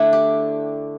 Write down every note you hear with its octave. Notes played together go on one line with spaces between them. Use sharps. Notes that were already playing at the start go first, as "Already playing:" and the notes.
Already playing: D3 A3 D4 E4
G4